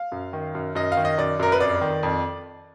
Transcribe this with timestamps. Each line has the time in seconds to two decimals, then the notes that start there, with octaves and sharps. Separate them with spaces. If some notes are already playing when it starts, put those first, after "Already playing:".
Already playing: F5
0.12 F#2
0.33 D#3
0.55 F#2
0.75 F#2 D#5
0.92 F5
0.97 D#3
1.05 D#5
1.18 F#2 D5
1.40 F#2 A#4
1.52 B4
1.60 F2 D5
1.81 D#3
2.03 F2